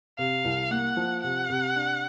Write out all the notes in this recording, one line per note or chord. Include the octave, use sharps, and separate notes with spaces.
C3 F5
C2
A#3 F#5
F3
C3 F#5
C3
D4